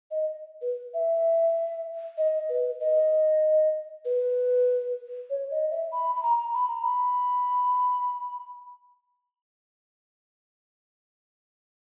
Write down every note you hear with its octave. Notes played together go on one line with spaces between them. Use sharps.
D#5
B4
E5
D#5
B4
D#5
B4
C#5
D#5
E5
B5
B5
A#5
B5
A#5
B5